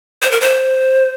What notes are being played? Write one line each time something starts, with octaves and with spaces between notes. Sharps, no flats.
C5
A#4
C5